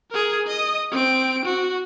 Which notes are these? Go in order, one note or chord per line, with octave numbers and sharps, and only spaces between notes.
G#4 A#4
D#5 D#6
C4 D7
F#4